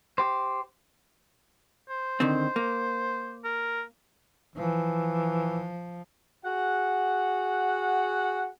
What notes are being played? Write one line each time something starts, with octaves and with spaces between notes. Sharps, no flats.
G4 C5
C5
D3 D#3 C4
A#3
A#4
E3 F3
F#4 G#4 F#5